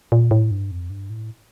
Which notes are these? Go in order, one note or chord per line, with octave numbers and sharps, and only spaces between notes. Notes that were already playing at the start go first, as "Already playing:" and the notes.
A#2
A2
G2
F2
G2
A2